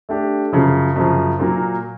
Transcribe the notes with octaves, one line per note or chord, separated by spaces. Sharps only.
A3 D4 G4
F#2 C#3 F3
F#2 C#3 F3
A#2 F#3 A#3